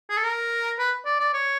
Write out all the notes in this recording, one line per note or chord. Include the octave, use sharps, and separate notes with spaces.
G#4
A4
A#4
B4
D5
D5
C#5